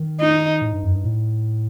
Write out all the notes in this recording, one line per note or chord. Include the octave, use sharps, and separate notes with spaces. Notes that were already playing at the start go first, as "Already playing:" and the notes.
Already playing: D#3
D#4
A2
G2
F#2
G2
A2